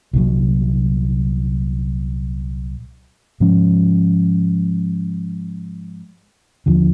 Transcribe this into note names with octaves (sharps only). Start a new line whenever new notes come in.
C2 A#2 F#3
G#2 F3 G#3 C#4
D#2 D3 F3